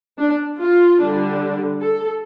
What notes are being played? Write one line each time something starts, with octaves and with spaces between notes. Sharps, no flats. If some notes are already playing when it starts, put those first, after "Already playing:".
D4
F4
D3 G3 D4
A4